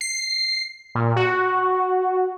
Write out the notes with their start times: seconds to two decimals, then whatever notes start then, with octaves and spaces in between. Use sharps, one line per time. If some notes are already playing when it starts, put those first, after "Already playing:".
0.01 C7
0.95 A#2
1.16 F#4